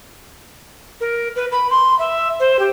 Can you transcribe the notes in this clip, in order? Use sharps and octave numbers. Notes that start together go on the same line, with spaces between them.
A#4
B4
B5
C6
E5
C5
G4